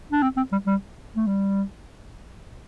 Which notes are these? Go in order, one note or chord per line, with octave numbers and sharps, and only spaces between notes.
D4
C4
C4
G3
G3
A3
G3